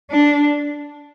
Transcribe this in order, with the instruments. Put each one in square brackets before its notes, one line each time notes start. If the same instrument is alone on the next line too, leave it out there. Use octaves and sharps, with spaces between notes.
[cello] D4